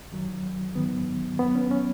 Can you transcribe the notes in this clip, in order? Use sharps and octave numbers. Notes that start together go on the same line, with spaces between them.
F#2 D#3 F#3
G#2 D#3 F#3 B3
F#2 F#3 B3
C#4
C#4